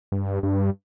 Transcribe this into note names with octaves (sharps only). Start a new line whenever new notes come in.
G2
G2